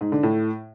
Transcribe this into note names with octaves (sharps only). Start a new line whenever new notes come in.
G#2
D3
A2